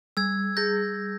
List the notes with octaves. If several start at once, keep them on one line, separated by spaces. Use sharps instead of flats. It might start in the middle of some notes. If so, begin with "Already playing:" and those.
G3 E6 G#6
G#4 G6 A#6